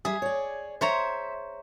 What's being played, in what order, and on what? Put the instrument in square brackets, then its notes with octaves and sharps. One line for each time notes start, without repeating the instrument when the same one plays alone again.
[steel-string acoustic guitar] G3 E5 [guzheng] G#4
[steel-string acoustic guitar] C#5 D5
[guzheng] C5 C#5 A#5 [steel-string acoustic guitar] E5